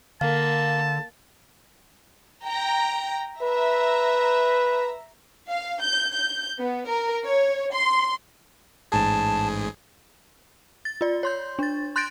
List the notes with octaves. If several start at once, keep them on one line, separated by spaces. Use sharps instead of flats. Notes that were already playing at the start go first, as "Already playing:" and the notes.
D3 A#3 F5 A5
G5 A#5
B4 E5 A#5
F5
G6
G6
B3
A#4
C#5
C6
A1 G#2 G#4 A5
A6
F4 D5
C#5 C6 G6
D4 A6
C6 F#6 G6 A6 A#6 D7